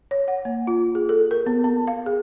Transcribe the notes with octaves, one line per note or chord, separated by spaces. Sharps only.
C#5
F#5
A#3
F4
G#4
A4
A#4
B3
B3
F5
G#4